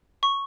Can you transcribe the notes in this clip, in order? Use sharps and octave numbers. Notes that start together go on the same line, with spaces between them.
C#6